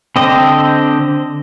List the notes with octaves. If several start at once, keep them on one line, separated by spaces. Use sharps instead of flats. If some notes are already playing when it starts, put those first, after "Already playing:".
D3 C4 D#5